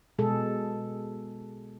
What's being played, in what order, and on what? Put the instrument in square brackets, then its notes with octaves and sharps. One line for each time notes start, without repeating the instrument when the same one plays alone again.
[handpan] B2 G#3 G#4 A4